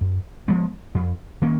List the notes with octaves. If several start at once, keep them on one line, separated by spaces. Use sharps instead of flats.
F#2
F3 G#3 B3
F2
D#3 A#3 C#4